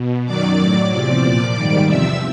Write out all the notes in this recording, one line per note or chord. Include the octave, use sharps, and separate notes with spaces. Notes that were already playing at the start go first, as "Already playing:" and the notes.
Already playing: B2
F#2 D#3 F#3 D5 D6
A2 F#3
E2 C3 F3 D5 D6
A#2 F3
G#2 D#3 G3
E2 C3 F3 E5 E6